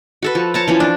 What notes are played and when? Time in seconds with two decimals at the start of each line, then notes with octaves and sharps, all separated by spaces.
0.22 F#4 A4 B4
0.35 F3
0.54 C#5 A5 A#5
0.68 E3 F3 C#4
0.80 D4